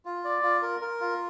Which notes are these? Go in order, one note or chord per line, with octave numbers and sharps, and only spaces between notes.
F4
D5
F4
A#4
A#4
F4